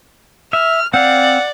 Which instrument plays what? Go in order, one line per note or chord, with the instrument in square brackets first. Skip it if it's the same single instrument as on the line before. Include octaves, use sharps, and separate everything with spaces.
[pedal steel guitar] E5 [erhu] F6
[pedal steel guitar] C4 F5 [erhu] D5 [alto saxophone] F#5